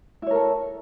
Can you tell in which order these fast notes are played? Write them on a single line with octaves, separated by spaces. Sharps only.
E4 C#5 A#4 A4